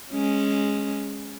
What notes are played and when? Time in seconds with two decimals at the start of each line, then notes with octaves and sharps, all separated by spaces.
0.11 G#3 C#4